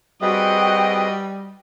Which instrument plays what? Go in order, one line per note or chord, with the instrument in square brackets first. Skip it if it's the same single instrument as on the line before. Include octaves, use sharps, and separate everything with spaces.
[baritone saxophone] G3 [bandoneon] C4 G#4 B4 [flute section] F#4 G5 [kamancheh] D#5